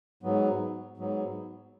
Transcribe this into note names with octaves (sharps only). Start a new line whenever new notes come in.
G#2 F#3 B3
G#2 F#3 B3